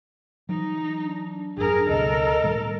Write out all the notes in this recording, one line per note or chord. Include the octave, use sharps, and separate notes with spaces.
E3 F#3 D#4
D4
G#1 F#2 G#4 A#4
C#2 B2 A4 A#4 D#5
A2 D#3 G3